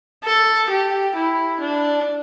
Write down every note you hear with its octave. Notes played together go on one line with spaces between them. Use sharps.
A4
G4
E4
D4